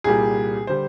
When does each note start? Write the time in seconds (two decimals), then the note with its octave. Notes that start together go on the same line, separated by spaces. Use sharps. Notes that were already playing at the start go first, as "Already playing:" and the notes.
0.04 C2 A#2 G3 G#4
0.67 D3 G3 C5